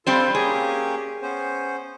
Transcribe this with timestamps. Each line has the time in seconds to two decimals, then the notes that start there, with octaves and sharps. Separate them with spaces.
0.07 G3 C4 F4 A4 C5
0.35 A#3 C#4 G4 G#4
1.22 B3 C#4 C5